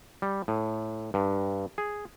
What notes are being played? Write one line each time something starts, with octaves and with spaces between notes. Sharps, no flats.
G3
A2
G2
G#4